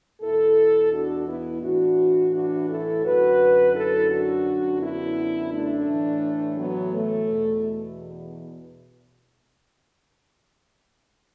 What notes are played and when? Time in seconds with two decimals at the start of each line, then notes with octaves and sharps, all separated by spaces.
0.22 E2 B2 E4 A4
0.92 D4 F#4
1.27 B3 E4
1.62 A2 E3 D4 F#4
2.33 D4 F#4
2.69 E4 A4
3.04 F#2 D3 F#4 B4
3.74 E4 A4
4.09 D4 F#4
4.45 F#2 D3
4.80 B3 E4
5.51 A3 D4
5.86 A2 E3
6.57 F#3 B3
6.93 A3
7.28 E2 B2